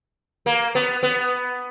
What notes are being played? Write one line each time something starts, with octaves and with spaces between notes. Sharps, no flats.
A#3
B3
B3